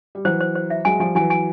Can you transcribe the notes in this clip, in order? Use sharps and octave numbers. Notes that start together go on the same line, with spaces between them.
G3
E3 F#3 C5
C5
C5
E5
F#3 G#3 G#5
F3 G3 G#5
E3 F#3 G#5
G#5